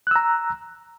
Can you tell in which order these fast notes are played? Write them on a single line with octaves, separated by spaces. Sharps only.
F#6 E6 A#5